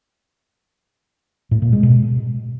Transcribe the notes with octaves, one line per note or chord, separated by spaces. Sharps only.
A2
A#2
G#3
B2